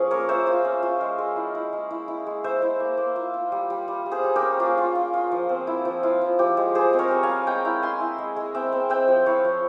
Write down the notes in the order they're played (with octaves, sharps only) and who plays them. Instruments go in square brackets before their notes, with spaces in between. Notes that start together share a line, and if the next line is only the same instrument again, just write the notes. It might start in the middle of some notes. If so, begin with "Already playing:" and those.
Already playing: [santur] F3 C#4 F4 G#4
A#3 A#4 C#5
F4 C5 E5
F4
C#4
F4
G#3
G#3
E4
E4
G#3
E4
E4
G#3
E4 C5 E5
E4
A#3
A#3
F4
F4
G3
G3
G3
G3
G#4 C5
G3
G4 A#4
C#4
A#3 F4 G#4
F4
F4
F4
F3
C4
E4
F3
E4 F4
F3
F3 G4
G#3
G3 G#4 C5
C4
A#4 C#5
G3
F5 G#5
G3
G#3 G5 A#5
E4
E4 G#5 C6
E4
G#3
G#3
C4 E5 G5
C4
C4 E5 G5
F3
E4 C#5 F5
F3